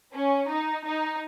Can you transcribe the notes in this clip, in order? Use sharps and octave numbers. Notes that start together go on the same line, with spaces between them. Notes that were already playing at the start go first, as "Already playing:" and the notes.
C#4
D#4
D#4